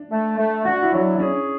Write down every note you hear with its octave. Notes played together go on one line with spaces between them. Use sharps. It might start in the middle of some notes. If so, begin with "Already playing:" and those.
Already playing: D4
A3
A3
D4 F#4
E4
F#3 D4
D4
C#4 G#4